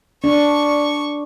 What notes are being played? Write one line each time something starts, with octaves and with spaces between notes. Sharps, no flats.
D4 C#6